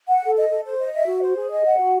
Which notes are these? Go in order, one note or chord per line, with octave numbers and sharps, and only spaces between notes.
F#5
A4
D#5
A4
C5
D#5
E5
F#4
C5
G#4
D#5
F#5
F#4